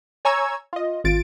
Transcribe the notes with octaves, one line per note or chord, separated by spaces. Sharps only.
C#5 G#5 A#5 C#6 E6 G#6
F4 D#5
G#1 F4 A6 D7